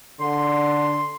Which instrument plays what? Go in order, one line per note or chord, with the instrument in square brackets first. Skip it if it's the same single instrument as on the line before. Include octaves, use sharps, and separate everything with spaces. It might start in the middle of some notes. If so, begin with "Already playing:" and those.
[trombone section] D3 [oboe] C6